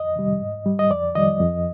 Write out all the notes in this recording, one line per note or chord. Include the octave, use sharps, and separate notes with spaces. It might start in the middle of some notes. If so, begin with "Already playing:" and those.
Already playing: F2 D#5
C3 D#3 G3
G#2
G3
D#5
F2 D5
D#3 G3 D#5
F2